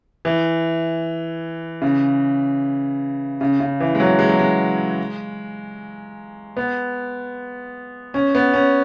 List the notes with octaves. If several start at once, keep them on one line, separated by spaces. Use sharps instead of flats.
E3
C#3
C#3
C#3
E3
G#3
F#3
G#3
F#3
G#3
B3
C#4
B3
C#4